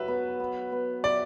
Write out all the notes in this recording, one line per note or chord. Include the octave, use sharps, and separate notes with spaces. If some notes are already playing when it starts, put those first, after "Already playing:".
Already playing: F#3 B4 E5
B3
B3
B3
D5 E5